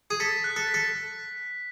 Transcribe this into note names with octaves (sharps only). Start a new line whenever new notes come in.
G#4
A4 B6
F#6
A4
B6
A4